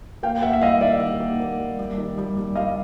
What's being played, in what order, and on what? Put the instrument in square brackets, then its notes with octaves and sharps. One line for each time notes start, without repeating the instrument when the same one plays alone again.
[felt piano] A#3 [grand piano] F5 G5
[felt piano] A#3 [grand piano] E5 F#5
[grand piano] E5
[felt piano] G3 [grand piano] D#5 F5
[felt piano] D#3 [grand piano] D5 E5
[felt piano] D#3
A#3
A#3
G3
G3
D#3
G3
G3
[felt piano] G3 [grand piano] D#5 F5